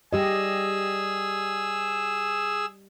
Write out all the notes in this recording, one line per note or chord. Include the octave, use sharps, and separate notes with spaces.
G3 G4 G#4 D#5 E6